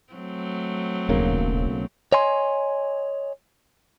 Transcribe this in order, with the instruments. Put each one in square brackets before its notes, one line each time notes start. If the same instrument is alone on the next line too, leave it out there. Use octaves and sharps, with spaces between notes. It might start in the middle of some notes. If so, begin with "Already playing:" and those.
[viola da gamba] F#3 A3 C4
[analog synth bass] D#1 [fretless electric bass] B1 C#3 A#3
[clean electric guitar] C#5 D#5 G#5 C6